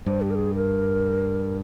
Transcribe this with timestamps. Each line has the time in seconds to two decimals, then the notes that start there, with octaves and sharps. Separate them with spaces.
0.06 G2 C5
0.22 G4
0.31 A#4
0.35 G#4
0.55 A#4